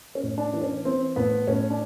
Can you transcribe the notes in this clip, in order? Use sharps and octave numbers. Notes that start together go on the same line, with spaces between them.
C#4
A2
D4
E3
C#4
E3 C4
A2 B3
A2 C#4
D4